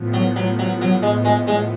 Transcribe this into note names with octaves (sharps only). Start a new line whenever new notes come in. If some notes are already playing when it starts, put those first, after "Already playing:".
Already playing: A2 F3 B3
F#3
F#3
F#3
F#3
G#3
G#3
G#3